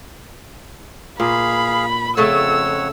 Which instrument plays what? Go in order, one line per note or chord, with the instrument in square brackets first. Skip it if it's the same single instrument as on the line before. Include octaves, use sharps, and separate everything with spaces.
[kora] A#2 [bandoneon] G#4 F5 [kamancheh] B5
[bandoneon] F2 C#5 F#5 [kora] C#3 A3 A4 [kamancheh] E6